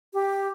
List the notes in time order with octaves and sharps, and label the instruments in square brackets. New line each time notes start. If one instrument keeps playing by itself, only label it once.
[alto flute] G4